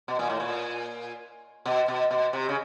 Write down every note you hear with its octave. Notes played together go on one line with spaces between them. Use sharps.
B2
A#2
A2
A#2
B2
B2
B2
C3
C#3